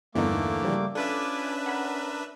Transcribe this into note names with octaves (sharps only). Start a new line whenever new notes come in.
E2 G2 D3 E3 A3 A#3 D#4 D6
C#3 F3 G3
C#4 D4 F4 A4 B4 E5 G#5 D6
A#4 F#5 G#5 B5